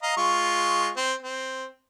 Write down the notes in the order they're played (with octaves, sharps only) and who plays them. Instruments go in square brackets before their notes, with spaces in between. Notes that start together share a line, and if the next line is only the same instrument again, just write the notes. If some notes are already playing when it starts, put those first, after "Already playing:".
[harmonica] D#5 F5 A#5
G#3 F4 C#6
C4
C4